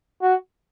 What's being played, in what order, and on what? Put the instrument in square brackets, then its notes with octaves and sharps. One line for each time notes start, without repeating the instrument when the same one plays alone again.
[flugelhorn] F#4